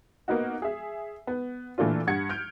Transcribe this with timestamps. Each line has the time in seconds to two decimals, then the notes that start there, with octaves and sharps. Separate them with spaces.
0.28 A#3 B3 D#4 F#4
0.62 G#4 E5
1.27 B3
1.78 A#2 E3 A3 D4 F4
2.07 G2 F#5 G#6 C#7
2.29 F6 G6 D7